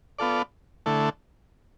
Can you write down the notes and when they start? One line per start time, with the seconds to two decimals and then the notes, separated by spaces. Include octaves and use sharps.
0.19 B3 F4 A4 D5
0.86 D3 A3 E4 A4